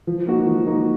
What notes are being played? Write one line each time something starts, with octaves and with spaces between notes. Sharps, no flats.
F3
A#3 D#4 F#4
F3
A#3 D#4 F#4